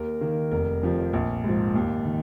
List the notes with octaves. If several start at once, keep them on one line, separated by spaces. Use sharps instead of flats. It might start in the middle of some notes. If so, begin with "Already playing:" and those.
Already playing: D#2 A#4
D#3 A#3
F1 A#4
F2 C3 F3
A#1
G#2 F3
D#2
D#3